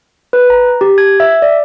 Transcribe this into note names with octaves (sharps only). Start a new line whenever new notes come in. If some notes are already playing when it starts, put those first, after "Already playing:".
B4
A#5
G4
G#6
E5
D5